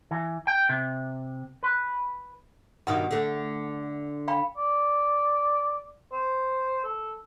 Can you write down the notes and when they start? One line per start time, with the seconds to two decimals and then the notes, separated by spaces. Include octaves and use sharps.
0.11 E3
0.47 G5
0.69 C3
1.63 B4
2.87 G2 B2 D#3 F#5 D#6
3.11 D3 A3
4.28 F5 G5 B5
4.57 D5
6.12 C5
6.84 A4